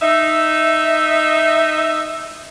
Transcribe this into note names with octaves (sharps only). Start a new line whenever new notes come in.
D#4 E5